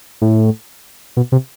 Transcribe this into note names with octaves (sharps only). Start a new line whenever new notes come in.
A2
B2
C3